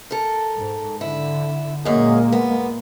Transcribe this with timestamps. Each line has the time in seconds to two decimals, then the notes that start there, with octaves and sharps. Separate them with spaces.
0.11 A4 A#4
0.56 G#2
1.01 D3 E4
1.85 F#2 A#2 G#3 A#3 D#4 G#4
2.32 B3